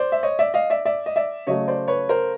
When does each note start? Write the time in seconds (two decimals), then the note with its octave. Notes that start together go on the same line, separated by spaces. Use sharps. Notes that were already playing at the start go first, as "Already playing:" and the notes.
Already playing: C5 D5
0.12 E5
0.23 C#5 D#5
0.39 D5 E5
0.54 D#5 F5
0.70 D5 E5
0.85 D5 E5
1.06 D#5
1.16 D5 E5
1.47 C#3 F#3 A3 C#5 D#5
1.68 C5 D5
1.88 B4 C#5
2.09 A#4 C5